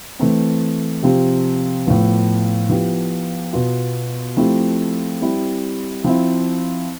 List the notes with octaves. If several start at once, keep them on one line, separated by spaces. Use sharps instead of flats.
E3 A3 C4
C3 F3 C4 G4
A2 F3 B3
F3 B3 E4 G4
B2 B3 F4
F3 A3 C4 E4 G4
G3 C4 E4 G4
F3 C4 E4